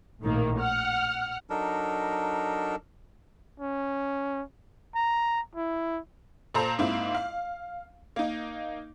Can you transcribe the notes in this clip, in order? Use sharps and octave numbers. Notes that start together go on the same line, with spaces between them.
A#1 A2 D#3 A#3
F#5 F6
F#3 D4 D#4 A4 A#4
C#4
A#5
E4
A#2 A4 C5 A#5
G#2 A#3 C4 E4 F4
F5
A#3 D#4